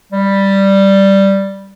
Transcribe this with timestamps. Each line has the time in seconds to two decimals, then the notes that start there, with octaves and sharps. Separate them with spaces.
0.12 G3